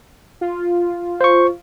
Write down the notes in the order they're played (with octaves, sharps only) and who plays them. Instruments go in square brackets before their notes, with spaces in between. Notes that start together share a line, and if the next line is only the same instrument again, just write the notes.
[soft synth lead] F4
[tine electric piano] C5 C#6